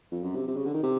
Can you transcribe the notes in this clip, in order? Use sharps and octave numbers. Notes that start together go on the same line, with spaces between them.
F2
F#2
C3
C3
C#3
D3
D#3
C3